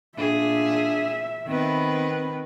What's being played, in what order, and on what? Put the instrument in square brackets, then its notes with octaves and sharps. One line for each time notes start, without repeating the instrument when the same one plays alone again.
[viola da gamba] A#2 G#4 [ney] D4 [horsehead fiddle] E5
[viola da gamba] D#3 B3 B4 [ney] C4